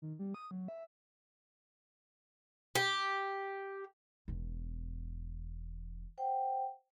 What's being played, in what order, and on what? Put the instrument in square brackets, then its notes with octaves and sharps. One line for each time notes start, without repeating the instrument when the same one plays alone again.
[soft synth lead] D#3
G3
D#6
F#3
E5
[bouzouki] G4
[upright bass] E1 E2
[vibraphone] C5 F#5 G5